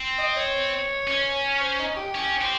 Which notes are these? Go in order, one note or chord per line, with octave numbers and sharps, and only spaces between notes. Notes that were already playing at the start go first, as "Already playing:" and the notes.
Already playing: C4
D#5
C#5
C#4
C5
D#4
G4
C#4
C4